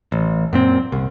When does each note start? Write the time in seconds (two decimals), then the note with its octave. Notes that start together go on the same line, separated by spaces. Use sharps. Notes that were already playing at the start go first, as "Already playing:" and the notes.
0.12 A1
0.53 F#2 A#2 C4
0.92 C2